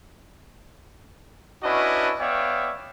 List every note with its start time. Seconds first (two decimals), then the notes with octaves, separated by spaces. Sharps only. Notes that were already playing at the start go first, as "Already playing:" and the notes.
1.63 C#4 D4 E4 F#4 B4 D#5
2.20 B3 C#5 D5 E5 F5 G5